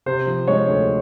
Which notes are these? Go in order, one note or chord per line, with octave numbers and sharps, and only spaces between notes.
C3 C5
F3
G#3 C#5
D2